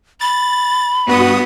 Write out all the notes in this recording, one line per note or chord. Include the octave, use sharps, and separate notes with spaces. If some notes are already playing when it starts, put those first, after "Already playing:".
B5 A6
G2 B3 F#4 D#6